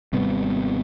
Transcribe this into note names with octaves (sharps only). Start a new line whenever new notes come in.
G#1 C3 G3 B3